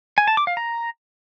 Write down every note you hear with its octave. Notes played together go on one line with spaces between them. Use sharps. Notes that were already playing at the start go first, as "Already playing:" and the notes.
G#5
A5
D6
F5
A#5